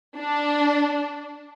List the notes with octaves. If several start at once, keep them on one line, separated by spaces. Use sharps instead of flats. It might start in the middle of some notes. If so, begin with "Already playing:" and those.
D4